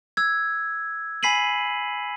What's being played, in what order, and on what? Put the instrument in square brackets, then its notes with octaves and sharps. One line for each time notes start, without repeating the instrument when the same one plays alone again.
[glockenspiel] E6 G#6
G#5 B5 B6 C7 D#7 F#7